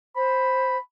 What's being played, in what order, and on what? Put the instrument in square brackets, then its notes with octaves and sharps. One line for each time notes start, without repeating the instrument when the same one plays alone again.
[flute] C5 [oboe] B5